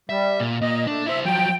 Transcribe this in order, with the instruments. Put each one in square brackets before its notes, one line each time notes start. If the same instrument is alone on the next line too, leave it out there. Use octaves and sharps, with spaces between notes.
[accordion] G3 [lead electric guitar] E5
[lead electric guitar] A#2
[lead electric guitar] A#2 [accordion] D#5
[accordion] A3 [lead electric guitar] D4
[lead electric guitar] E4 C5 [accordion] E5
[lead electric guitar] F3 F#3 [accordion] G5